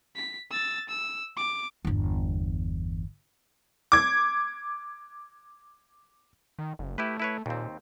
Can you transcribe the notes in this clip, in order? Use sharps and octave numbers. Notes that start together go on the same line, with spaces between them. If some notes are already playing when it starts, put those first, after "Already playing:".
B6
E6 A6
E6
D6
G1 E2
D6 G#6
D#3
F#1
A3 E4 G4 B4
E4 B4 C#5
D#2 A#2 C4